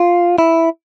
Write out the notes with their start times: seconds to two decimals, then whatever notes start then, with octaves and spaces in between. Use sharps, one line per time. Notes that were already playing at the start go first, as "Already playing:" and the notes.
Already playing: F4
0.38 E4